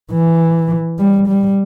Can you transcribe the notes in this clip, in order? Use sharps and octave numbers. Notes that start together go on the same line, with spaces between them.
E3
G3
G3